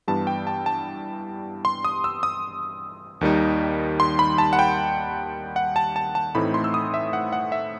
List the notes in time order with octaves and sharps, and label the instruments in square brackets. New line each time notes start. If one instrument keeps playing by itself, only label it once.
[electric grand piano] G2 E3 G3 B3 E4 A5
G5
A5
A5
C6
D#6
E6
D#6
D#2 D#3 G3 D#4
C6
B5
A5
F#5
G5
F#5
A5
A5
A5
A2 E3 A3 C4 D#4 B5
C6
E6
D#6
E5
F#5
F#5
E5